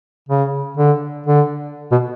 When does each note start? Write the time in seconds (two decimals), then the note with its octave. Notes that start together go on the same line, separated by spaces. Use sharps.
0.29 C#3
0.77 D3
1.26 D3
1.92 B2